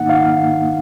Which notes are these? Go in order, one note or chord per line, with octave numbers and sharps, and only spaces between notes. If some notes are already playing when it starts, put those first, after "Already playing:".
Already playing: G#2 D#3 A#3 D#4 F#5
F5